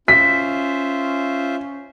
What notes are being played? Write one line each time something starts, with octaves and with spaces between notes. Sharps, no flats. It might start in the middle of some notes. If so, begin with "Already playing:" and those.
C#4 F4 C5 E5 B6